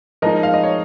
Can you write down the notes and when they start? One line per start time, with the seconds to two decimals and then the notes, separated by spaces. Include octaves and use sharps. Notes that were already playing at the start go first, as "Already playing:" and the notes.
0.22 F3 G#3 D#4 A#4 D#5
0.43 F5
0.54 D#5
0.63 C#5